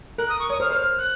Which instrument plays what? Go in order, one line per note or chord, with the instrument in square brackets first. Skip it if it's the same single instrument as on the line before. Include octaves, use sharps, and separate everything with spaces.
[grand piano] A#4 [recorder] F#6
[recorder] D#6
C#6
[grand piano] C#5 [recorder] D#6
[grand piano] C5 [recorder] F6
[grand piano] C5 [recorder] F6
[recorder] F6
F#6